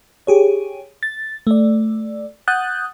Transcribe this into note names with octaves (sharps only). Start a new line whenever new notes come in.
G4 G#4 C#5
A6
A3 D5
F#5 D#6 F#6 G6 A6